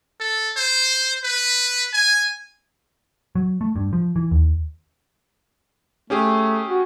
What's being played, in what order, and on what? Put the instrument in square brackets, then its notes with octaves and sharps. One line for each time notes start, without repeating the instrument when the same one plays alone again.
[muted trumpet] A4
C5
B4
G#5
[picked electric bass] F#3
A3
G2
F3
E3
D#2
[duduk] A3 [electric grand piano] C#4 G4 G#4
[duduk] F#4